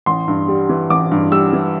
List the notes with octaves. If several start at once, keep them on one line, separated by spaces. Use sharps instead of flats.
A1 C6
G2
G3
E3
A1 D6
G2
G3 E6
E3